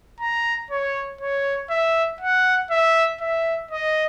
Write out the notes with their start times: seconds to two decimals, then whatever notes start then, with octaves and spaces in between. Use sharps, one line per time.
0.21 A#5
0.71 C#5
1.21 C#5
1.70 E5
2.20 F#5
2.71 E5
3.21 E5
3.71 D#5